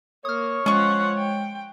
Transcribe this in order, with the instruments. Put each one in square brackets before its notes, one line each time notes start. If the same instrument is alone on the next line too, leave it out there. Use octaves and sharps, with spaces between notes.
[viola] A#3 [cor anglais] C#5 [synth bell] D#6 F6
[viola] F3 F#5 [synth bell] G#3 [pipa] C#4 C#6
[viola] G5